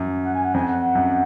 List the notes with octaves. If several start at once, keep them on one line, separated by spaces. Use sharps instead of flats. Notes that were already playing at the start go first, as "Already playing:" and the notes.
Already playing: F#2
F#5
G#5
F#5
F2 G#5
F#5
F#5
F#2